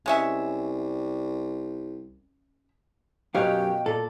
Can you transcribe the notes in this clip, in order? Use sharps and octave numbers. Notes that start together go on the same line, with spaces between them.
C2 G#3 C#4 E5
F#2 B2 D#4 F#4 G4 C#5 F5 G5
A#2 A4 D5